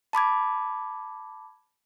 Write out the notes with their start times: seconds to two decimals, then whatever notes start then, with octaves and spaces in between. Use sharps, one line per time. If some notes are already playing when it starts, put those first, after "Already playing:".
0.13 A5 B5 D6 G#6